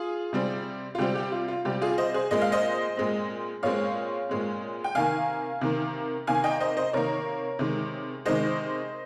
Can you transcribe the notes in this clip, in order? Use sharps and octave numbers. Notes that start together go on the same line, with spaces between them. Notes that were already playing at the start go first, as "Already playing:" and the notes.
Already playing: F4 G#4
C3 G3 C4
F4
C3 G3 C4 G4
G4
F4
F4
C3 G3 C4 G4
F4 G#4
C5 D#5
G#4 C5
A#2 G#3 C4 D#5
F5
C5 D#5
A#2 G#3 C4
A#2 G#3 C4 C#5 F5
A#2 G#3 C4
G5
C3 D#3 A#3 F5 G#5
C3 D#3 A#3
C3 D#3 A#3 F5 G#5
D#5 G5
C5 D#5
C5 D#5
C3 D#3 A#3 A#4 C#5
C3 D#3 G#3
C3 D#3 G#3 C5 D#5